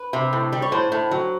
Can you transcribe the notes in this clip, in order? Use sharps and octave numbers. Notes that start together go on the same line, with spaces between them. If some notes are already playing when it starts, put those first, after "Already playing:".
Already playing: B4
C3
A2
G3
C#5
A2 C5
A2
F#3